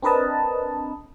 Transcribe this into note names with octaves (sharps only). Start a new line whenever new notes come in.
C4 D4 A#4 B4 D#5 A5